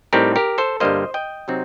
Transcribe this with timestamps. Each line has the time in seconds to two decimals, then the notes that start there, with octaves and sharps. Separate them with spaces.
0.13 A2 G3 C4 D#4 G4 A#4
0.36 G4 A#4
0.58 A4 C5
0.80 G2 D3 G3 A#3 C5 D#5
1.14 D#5 G5
1.48 C3 F#3 C4 D#4